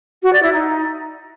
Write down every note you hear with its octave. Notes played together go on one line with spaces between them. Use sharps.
F#4
D5
E4
D#4